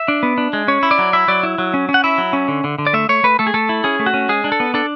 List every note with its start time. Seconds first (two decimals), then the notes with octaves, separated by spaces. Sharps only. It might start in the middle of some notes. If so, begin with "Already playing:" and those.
Already playing: E5
0.08 D4
0.23 B3
0.38 D4
0.53 G#3
0.68 C#4 C#5
0.83 E4
0.91 D5
0.99 F#3
1.13 E4 E5
1.28 F#3 D5
1.43 E4
1.58 F#3
1.74 C#4
1.89 C#4
1.94 F#5
2.04 E4 E5
2.18 F#3
2.33 C#4
2.48 D3
2.64 D3
2.78 D3
2.87 D5
2.93 A3 E5
3.09 A3 C#5
3.23 A3 B4
3.39 A3 A4
3.47 G#4
3.54 A3 A4
3.69 E4
3.84 C#4 G#4
3.99 A3
4.06 F#4
4.14 C#4
4.29 G#3 G#4
4.44 D4
4.52 A4
4.60 B3
4.74 D4 A4